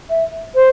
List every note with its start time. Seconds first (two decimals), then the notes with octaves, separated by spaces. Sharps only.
0.09 E5
0.55 C5